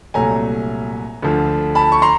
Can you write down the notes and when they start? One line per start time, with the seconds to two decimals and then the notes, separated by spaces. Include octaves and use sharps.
0.14 C2 A#2 F#3 A3 G#5 A#5
1.22 D2 D3 F3
1.75 A5 B5
1.92 C#6
2.02 A#5 C6